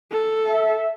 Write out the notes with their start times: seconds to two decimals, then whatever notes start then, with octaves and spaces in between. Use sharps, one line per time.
0.12 A4
0.47 E5